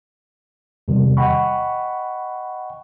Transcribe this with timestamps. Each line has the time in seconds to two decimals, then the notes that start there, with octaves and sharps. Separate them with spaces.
0.88 E2 C3 D#3 G3
1.17 D#5 F#5 G5 B5 C#6